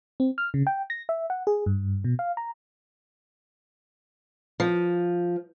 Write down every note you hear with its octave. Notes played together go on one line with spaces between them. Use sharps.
C4
F6
C#3
G5
A#6
E5
F#5
G#4
G2
B2
F5
A#5
F3